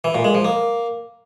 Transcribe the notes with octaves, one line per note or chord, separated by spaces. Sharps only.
E3
A#2
G#3
F3
A#3